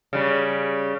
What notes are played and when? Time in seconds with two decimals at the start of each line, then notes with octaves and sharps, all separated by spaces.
0.13 C#3 G3